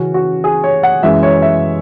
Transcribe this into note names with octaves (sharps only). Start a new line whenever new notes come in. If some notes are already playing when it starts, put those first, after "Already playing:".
Already playing: C#3 E3 C#4 F#4
F#4
G#4
C#5
F#5
F#2 E3 G#3 E5
C#5
E5